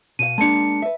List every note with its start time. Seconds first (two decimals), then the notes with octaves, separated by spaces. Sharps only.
0.19 B2 F5 D#7
0.38 G#3 A#3 D4 A5 C#7
0.82 B4 E5